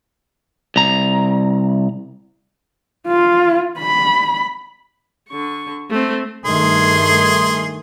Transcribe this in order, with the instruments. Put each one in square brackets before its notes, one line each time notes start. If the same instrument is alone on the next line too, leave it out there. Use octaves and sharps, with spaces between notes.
[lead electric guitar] C2 A#5
[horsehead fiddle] F4
B5
[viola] D3 C#6
A3 C4
[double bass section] G2 D#3 A3 [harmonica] G#4 C6